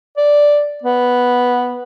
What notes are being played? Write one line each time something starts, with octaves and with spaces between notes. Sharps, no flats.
D5
B3